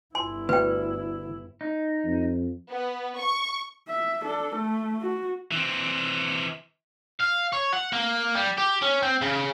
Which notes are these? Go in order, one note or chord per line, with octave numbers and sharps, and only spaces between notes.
G1 E4 G#5 C6
D2 B4 G5
D#4
F2
B3
C#6
E5
D4 A4
A3
F#4
E3 C4
F5
C#5
F#5
A#3
G3
G4
C#4
C4
C#3